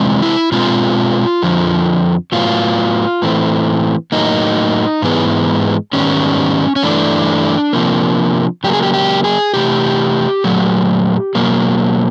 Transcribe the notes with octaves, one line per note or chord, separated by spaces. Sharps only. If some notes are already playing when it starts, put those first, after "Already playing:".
Already playing: C3 E3 G#3 C4
E4
B2 G#3 C4 F4
F2 D3 F3
A2 F#3 B3 F4
A2 E3 A3 C4
A2 F#3 A#3 D#4
G#2 E3 G#3 B3
G#2 D#3 G3 B3 C#4
C#4
G2 E3 A3 D4
C3 F3 A#3
C#3 F#3 A#3 G4
G#4
G4
G4
G#4
C3 E3 A3 G4
A#2 F#3 A3
B2 F#3 A#3